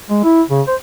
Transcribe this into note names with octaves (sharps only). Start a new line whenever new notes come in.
G#3
E4
C#3
C5